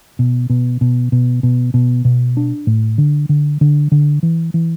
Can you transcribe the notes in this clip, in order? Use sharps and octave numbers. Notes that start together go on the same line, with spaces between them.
B2
B2
B2
B2
B2
B2
B2
D4
A2
D3
D3
D3
D3
E3
E3